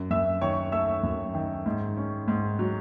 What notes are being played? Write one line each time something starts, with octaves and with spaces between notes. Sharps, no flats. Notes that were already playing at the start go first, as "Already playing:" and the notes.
Already playing: F#2
F#2 E5 E6
D#3 C#5 C#6
A3 E5 E6
F#2
D#3
G#2
C#4
G#2
F#3